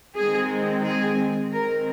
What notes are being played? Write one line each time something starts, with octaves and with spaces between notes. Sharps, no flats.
D#3 G#3 C4 G#4
G#4
D#3 G#3 C4 A#4